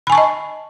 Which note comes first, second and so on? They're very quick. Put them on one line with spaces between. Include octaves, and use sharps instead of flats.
B5 G#5 C#6 A5 D#5